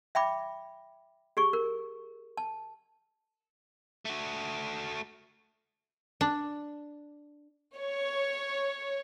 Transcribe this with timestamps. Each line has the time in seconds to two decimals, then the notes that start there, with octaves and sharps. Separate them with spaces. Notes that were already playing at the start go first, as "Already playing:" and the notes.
0.15 E5 G5 B5 D6
1.37 G4 G#4 C#6
1.53 A#4
2.37 A5
4.05 A3 F#4
6.21 D4
7.75 C#5